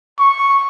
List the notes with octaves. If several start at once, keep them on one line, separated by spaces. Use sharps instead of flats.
C#6